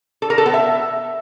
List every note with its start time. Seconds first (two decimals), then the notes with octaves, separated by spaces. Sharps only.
0.22 A4
0.30 A#4
0.38 A4
0.46 B3
0.54 E5